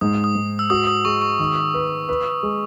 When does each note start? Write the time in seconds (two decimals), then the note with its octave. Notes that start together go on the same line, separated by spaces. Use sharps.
0.01 G#2 D#6
0.24 D#6
0.35 G#2
0.59 E6
0.70 F#4 D#6
0.87 D#6
1.05 G#3 C#6
1.22 C#6
1.39 D#3
1.74 B4
2.09 B4
2.43 G#3